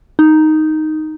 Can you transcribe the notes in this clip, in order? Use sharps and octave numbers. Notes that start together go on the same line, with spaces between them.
D#4